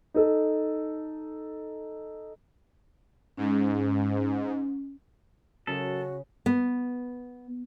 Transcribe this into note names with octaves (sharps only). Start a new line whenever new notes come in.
D#4 A4
G#2 C#4
F#2 C#3 F#4 A4
B3